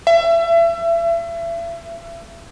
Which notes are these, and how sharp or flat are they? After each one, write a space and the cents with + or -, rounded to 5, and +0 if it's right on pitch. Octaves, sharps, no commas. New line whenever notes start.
E5 +35